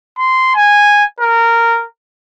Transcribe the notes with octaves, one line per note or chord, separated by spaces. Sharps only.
C6
G#5
A#4